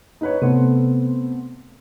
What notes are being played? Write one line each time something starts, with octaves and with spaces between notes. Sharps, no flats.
D#4 B4 C#5
C3 A3 B3 C4